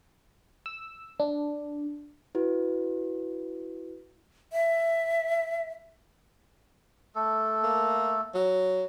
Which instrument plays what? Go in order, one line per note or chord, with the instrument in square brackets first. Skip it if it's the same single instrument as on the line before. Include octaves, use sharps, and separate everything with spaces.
[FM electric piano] E6
D4
[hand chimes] E4 F#4 B4
[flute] E5
[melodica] A3 A4
[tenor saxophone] A#3
F#3